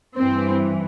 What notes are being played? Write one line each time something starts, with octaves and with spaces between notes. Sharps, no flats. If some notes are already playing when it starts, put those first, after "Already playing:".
G2 E3 C4